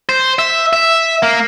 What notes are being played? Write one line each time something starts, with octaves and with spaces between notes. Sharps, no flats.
C5
E5
E5
A#3